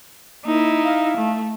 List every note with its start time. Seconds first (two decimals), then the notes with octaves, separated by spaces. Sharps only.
0.45 A#3 D#4 E4
0.84 F5
1.17 A3